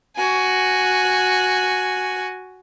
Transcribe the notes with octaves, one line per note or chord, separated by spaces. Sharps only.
F#4 G#5